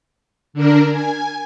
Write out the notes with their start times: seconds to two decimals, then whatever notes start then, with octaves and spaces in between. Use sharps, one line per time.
0.53 D3 D4 A#4
0.90 G#5